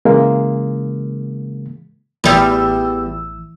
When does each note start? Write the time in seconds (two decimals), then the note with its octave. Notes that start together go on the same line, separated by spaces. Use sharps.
0.05 C#3 E3 G#3 A#3
2.24 A1 E2 E3 G3 E6